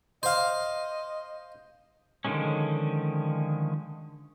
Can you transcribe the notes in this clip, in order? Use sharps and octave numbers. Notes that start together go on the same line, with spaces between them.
C5 D#5 F5
D3 D#3 F3 G#3 C#4